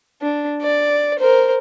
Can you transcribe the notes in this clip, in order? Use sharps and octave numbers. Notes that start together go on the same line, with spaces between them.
D4
D5
A#4 C5